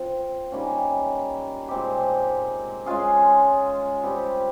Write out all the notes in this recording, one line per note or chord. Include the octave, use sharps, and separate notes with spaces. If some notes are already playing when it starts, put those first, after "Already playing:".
Already playing: F3 C4 F4
D#3 G3 A#3 C#4
A#2 G#3 C4 G4
G#3 C#4 F4 G#4
G3 C4 G4